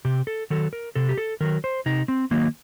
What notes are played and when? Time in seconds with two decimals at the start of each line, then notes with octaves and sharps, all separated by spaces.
0.05 C3 G4
0.27 A4
0.50 D#3 F#3 A4
0.73 A#4
0.96 C3 A4
1.09 G4
1.18 A4
1.40 D#3 F#3 A#4
1.64 C5
1.86 C3 D#4
2.08 C4
2.31 D#3 F#3 A#3